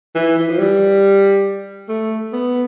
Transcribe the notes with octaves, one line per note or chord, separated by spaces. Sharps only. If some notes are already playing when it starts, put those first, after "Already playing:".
E3
E3
F3
G3
A3
B3